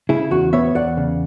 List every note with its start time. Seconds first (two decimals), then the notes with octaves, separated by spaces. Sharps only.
0.09 C#3 E4 G#4
0.31 E2 F#4
0.53 B3 C#5 E5
0.75 E2 D5 F#5
0.97 C#3